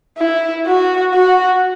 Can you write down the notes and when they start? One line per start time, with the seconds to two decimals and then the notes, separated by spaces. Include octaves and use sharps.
0.18 E4
0.66 F#4
1.14 F#4